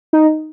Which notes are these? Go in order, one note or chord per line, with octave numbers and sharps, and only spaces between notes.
D#4